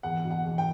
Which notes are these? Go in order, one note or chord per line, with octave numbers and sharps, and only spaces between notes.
E2 F#5
B2
F#5
E2
G5